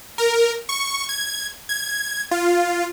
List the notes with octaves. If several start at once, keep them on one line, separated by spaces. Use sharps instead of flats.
A#4
C#6
G#6
G#6
F4